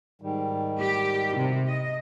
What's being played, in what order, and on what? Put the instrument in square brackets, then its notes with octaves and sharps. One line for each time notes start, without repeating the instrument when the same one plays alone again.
[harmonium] G#2 D#3 G3
[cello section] G4
C3
D#5